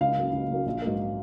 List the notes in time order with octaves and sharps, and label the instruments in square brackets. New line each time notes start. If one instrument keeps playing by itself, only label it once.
[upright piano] C#2 F5
C#3 F#3 A#3
C#2
C#3 F#3 A#3
A#1
G#2 F#3 A#3